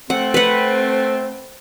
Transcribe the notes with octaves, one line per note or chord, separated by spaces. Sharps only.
A3 C4 F#5
B4 F#5